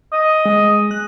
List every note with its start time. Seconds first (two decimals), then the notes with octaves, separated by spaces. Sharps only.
0.13 D#5
0.46 G#3
0.91 F#6